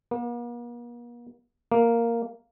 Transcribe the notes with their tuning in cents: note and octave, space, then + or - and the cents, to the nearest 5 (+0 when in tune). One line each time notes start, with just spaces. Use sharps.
A#3 +45
A#3 -5